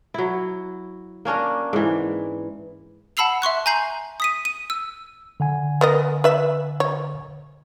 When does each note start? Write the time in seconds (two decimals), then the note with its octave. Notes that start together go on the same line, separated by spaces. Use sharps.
0.14 F#3 E4
1.25 A#3 C#4 D4 A#4
1.73 G#2 E3
3.17 F#5 A5 B5 E6 C7 F7
3.42 E5 C6 C#6 F#6
3.66 G#5 A#5 G6 C7 F#7
4.20 D#6 B6 D#7
4.45 D#7
4.70 E6
5.40 D3 F#5 G#5
5.81 B3 A#4 D#5
6.24 B4 E5
6.80 C#5